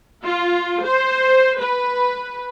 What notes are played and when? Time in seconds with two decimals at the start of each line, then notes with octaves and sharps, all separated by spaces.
0.25 F4
0.85 C5
1.61 B4